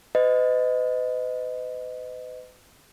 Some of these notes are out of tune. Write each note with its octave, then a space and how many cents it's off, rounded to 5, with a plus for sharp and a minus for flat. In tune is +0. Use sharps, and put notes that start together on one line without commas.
B4 +40 D#5 +0